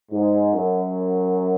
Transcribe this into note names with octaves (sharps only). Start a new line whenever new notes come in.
G#2
F#2